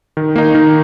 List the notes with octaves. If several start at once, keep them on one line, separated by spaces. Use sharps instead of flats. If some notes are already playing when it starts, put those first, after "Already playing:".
D#3
A#3 D#4
D#3